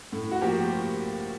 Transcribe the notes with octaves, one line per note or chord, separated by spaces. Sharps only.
A2
F#4
F3 A#3 G4